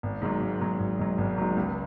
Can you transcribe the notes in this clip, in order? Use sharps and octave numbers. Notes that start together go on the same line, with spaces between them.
G#1
G#2 F#3
G#1
G#2 F#3
G#1
G#2 F#3
G#1
G#2 F#3
C#2